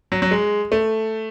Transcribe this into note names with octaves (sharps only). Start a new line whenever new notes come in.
F#3
F#3
G#3
A3